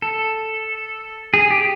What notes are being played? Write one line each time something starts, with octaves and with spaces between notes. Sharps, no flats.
A4
G#4
G4